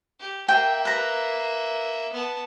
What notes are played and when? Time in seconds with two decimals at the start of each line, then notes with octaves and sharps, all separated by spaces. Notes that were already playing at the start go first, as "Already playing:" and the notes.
0.20 G4
0.48 A#3 E5 G5
0.85 B4 A#5
2.12 B3 A5